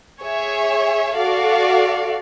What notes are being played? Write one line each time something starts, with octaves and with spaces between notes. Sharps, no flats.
G#4 C#5 E5
F#4 A4 D5 F5